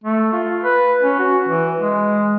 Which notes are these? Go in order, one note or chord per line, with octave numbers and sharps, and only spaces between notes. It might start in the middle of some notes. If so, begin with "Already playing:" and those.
A3
F4
B4
C#4
F#4
E3
G#3